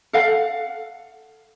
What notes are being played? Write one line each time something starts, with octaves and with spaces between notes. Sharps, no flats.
A4 F5 F#5